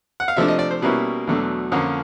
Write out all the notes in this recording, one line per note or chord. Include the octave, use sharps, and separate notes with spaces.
F#5
F5
C3 F3 A3 D4 E5
D#5
D5
C5
B2 G3 A#3 C#4 E4 B4
E2 B2 F#3 A3 D4
F2 D3 F3 A#3 C#4